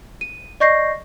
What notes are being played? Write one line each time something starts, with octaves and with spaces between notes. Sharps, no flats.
D#7
D5 D#5 C#6 G6 A#6 C7